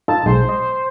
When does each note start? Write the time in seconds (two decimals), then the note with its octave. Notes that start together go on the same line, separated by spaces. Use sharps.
0.08 D#4 F4 A4 A5
0.26 B1 G#3 C5
0.49 D#5